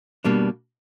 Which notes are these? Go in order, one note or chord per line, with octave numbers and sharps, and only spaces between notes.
B2 G3 A#3 D4